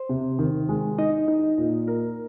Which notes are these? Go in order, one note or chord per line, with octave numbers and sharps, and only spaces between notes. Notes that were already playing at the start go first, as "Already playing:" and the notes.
Already playing: C5
C3
D#3
G#3
D#4 D#5
D#4
A#2
A#4